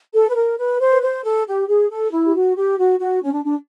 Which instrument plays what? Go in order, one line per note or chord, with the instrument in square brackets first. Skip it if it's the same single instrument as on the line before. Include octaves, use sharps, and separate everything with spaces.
[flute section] A4
B4
A#4
B4
C5
B4
C5
A4
G4
G#4
A4
E4
G4
F#4
G4
F#4
F#4
C#4
D4
D4